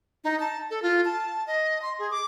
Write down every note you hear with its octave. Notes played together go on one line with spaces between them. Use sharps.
D#4
A5
A4
F4
A5
D#5
C6
G#4
D6